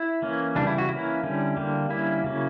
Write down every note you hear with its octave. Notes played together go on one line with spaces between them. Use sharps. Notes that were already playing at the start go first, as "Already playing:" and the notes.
Already playing: E4
E3 A#3 C#4
C#3 E3 G3 D4
E4
F#4
E3 A#3 C#4 E4
D3 G3 C#4
D3 G3 A#3
D3 G3 A#3 C#4 E4
C#3 F#3 A#3 C#4